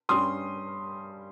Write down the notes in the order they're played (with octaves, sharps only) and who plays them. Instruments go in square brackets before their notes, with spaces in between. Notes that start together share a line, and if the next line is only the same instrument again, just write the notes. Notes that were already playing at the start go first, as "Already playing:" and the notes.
[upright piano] G2 G3 C#4 C6 D#6